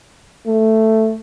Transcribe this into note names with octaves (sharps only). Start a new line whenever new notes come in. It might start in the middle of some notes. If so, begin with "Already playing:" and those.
A3